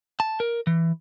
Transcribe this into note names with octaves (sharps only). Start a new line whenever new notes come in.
A5
A#4
E3